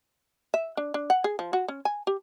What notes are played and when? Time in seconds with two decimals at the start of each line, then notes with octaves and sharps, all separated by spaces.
0.54 E5
0.77 D4
0.94 D4
1.10 F#5
1.24 G#4
1.39 F3
1.53 F#4
1.68 C#4
1.85 G#5
2.07 G4